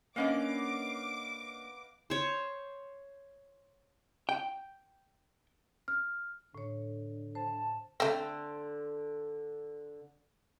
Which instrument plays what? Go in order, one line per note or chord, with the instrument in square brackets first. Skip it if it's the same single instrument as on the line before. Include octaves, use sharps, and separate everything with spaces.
[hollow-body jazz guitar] A#3 C#4 D4 [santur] B3 D#5 F5 [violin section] D6
[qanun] C5 C#5
[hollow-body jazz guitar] G5
[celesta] F6
[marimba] A2 C#5 [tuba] D3
[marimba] C5 [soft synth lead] A5
[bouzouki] D3 C5 [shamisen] A3 C4